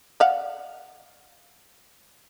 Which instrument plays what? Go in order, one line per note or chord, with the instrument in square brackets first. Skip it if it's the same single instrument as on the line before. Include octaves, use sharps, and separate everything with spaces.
[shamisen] D5 F5 F#5